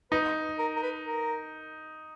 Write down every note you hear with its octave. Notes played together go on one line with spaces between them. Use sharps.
D#4 B4
A#4
A#4
B4
A#4